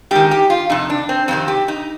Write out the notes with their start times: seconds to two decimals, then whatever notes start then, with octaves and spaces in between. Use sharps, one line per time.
0.11 G#2 D#3 G4
0.31 G4
0.50 F4
0.70 F2 C3 D#4
0.90 D4
1.09 C4
1.28 F2 C3 D#3 C4
1.48 G4
1.68 D#4